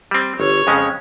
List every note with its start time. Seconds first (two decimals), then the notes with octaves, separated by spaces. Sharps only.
0.11 G3 C4
0.39 G1 C#5
0.67 F2 C#3 G#3 C#4